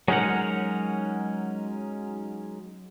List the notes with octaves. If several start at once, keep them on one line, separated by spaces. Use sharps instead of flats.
F#3 G#3 C#4 D#4 A#4 F#5